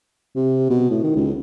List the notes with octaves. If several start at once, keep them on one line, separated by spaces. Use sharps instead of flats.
C3
B2
A2
D#3
C#2